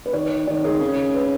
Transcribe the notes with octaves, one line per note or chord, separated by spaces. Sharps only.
B4
D#3 C#5
D#3 C#5
D#3 G#4
C#3
B4